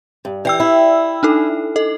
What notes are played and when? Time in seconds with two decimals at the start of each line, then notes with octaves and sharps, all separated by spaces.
0.25 G2
0.45 E3 D5 G5 E6
0.60 E4
1.23 D4 D#4 A4
1.76 A4 D#5